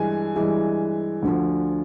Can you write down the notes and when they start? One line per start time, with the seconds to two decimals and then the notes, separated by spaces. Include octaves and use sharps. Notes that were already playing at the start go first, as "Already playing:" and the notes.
Already playing: G2 E3 G#3 G#5
0.36 G2 E3 G#3
1.22 D2 D3 F3